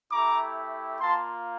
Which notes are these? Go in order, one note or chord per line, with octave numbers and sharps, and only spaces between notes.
A3 E4 G4 A#5 D6
A#3 F4 A5 C6